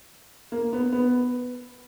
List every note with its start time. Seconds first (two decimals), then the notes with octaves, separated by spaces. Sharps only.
0.52 A#3
0.73 B3
0.92 B3